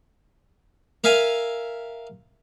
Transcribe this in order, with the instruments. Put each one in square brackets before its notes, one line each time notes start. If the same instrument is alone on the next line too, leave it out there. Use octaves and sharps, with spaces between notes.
[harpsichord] A#4 E5 F5 G#5